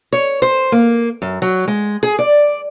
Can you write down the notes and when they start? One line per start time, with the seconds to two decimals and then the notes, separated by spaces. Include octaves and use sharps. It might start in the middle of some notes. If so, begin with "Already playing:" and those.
0.13 C#5
0.42 C5
0.72 A#3
1.22 F#2
1.42 F#3
1.68 G#3
2.03 G#4
2.19 D5